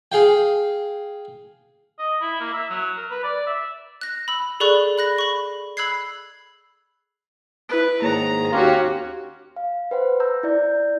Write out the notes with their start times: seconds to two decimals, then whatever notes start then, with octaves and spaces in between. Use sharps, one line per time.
0.12 G#4 F5 G5
1.99 D#5
2.21 E4
2.40 A#3
2.53 E5
2.70 F#3
2.97 A#4
3.10 B4
3.24 D5
3.47 E5
4.01 F#6 A#6
4.28 B5 E6
4.60 G#4 A4 D5 B5 C#6 F#6
4.98 B5 F#6 A#6
5.18 B5 C#6
5.77 B5 E6 F#6 G#6 C7
7.69 E4 B4 D7
8.02 G#2 D#3 A#3 G#4 C#5 A#5
8.52 D#2 C#4 F#4 G4 F5 C6
9.56 F5
9.91 B4 C5 F#5
10.20 A#5 E6 G6
10.43 E4 D5 G6